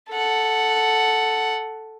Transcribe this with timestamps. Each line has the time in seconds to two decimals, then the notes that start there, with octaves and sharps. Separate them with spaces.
0.11 A4 F#5